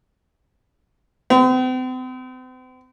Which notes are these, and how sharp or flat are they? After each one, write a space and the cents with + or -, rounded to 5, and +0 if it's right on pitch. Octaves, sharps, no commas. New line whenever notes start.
C4 -40